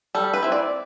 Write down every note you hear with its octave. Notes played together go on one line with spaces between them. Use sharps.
G3 A4
B4
C4 E4
D5